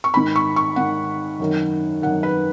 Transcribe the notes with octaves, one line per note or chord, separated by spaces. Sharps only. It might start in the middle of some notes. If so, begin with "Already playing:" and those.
C#6
G#2 D#3 B5
C#6
C#6
G#2 D#3 F#5
F#2 D#3
F#2 D#3 F#5
B4